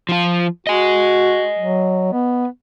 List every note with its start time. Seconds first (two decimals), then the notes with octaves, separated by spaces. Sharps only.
0.09 F3 F4
0.67 F#4 D#5 G#5
1.59 F#3
2.13 B3